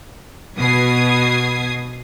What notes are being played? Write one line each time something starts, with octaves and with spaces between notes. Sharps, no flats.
B2 D#6 G#6 C7